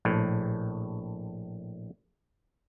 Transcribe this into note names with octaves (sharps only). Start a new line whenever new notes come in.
A#1 A2